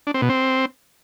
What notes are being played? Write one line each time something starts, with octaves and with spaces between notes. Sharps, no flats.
D4
C4
B2
C4